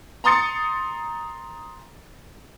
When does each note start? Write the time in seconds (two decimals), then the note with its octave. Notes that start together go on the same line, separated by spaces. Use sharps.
0.24 A#5 C6 D#6 A6 C#7